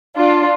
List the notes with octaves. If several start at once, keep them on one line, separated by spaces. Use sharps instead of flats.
D4 F4